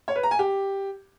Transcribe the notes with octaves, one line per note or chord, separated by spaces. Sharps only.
C#5
B4
A#5
G#5
G4